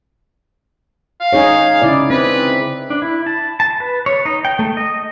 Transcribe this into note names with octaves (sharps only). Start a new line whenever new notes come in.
F5
D#4 G#4 C#5
C#3 E4 D5
C4 B4
D4
E4
A5
A5
B4
C#5
D#4
G5
A3
D#5